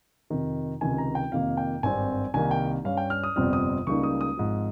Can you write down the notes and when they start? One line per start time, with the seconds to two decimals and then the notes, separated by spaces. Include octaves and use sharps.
0.30 F2 C3 D#3
0.81 C#2 C3 D#3 G#5
0.98 A#5
1.15 G5
1.32 F2 C3 D#3 A#3 F5
1.57 G5
1.83 G#1 G2 G3 C4 G#5
2.34 C2 C3 D#3 A#3 G#5
2.51 G5
2.84 G2 G3 C#4 F5
2.97 G5
3.10 F6
3.24 D#6
3.36 G1 F2 C3 G3 C4 F6
3.53 D#6
3.87 C#2 C#3 G3 A#3 D#4 C#6
4.03 D#6
4.21 D#6
4.37 G#1 G#2 F3